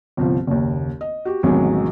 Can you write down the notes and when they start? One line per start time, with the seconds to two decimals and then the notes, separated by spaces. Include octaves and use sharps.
0.17 G1 C2 F3
0.47 F#1 D#2
1.01 D#5
1.25 F#4 G4
1.43 A1 E2 C3 D#3 F#3 G#3